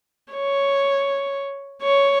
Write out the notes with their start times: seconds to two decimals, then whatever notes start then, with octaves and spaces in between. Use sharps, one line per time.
0.33 C#5
1.83 C#5